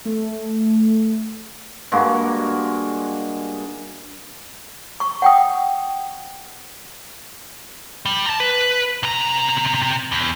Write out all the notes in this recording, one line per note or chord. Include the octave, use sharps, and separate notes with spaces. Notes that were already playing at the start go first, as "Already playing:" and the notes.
A3
G2 G#3 A#3 F#4
C#6
F#5 G5 D#6
G3
A5 A#5
B4
C3 A#5
E2